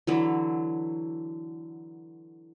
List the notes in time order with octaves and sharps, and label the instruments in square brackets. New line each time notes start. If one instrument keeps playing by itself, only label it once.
[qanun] D3 E3 F#3